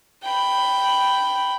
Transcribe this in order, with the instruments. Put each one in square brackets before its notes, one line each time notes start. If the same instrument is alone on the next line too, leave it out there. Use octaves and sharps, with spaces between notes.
[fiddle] G5 B5